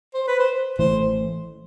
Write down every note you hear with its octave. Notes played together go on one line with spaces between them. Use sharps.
C5
B4
C5
A1 A2 E3 A3 C5